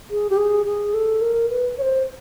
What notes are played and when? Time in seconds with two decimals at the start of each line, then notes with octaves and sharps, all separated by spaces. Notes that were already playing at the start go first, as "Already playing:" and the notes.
0.10 G#4
0.30 G4
0.37 G#4
0.66 G#4
0.94 A4
1.21 A#4
1.50 B4
1.78 C#5
1.82 C5